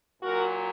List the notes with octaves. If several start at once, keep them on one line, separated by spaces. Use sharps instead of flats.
A#2 F#3 F#4 A#4